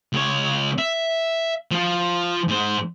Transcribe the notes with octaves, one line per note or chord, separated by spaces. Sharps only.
C#2 C#5
E5
F3 F4
G#2 C5